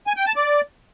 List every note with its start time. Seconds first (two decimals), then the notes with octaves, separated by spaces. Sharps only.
0.07 G#5
0.17 G5
0.26 A5
0.36 D5